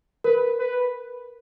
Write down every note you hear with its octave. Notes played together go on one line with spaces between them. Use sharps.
A#4 B4
B4